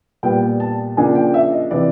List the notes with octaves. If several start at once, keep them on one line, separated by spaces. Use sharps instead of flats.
A#2 G3 B3 G5
A5
C#3 F3 A#3 D4 G#5
G5
E5
D#5
C3 E3 D5